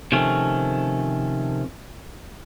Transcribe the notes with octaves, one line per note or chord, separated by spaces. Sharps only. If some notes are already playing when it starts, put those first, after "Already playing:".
C3 D#3 F3 A3 C#4